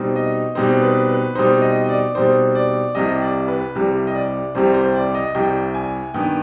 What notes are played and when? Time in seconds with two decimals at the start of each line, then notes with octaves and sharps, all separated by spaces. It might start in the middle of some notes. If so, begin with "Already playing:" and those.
Already playing: B2 G3 C4 D#4
0.16 D#5
0.55 B2 G3 C4 D#4 C5
0.82 B4
1.09 B4
1.35 B2 G3 C4 D#4 C5
1.62 D#5
1.84 D#5
1.89 D5
2.15 B2 G3 C4 D#4 C5
2.55 D5
2.95 C2 C3 G3 D#5
3.22 D5
3.48 B4
3.75 C2 C3 G3
4.07 D#5
4.15 D5
4.55 C2 C3 G3 C5
4.74 C5
4.95 D5
5.15 D#5
5.35 C2 C3 G3 G5
5.74 G#5
6.14 G2 D#3 B3 G5